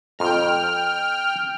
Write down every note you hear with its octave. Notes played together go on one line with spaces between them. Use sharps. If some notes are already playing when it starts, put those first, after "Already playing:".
F2 G5 A#5 F6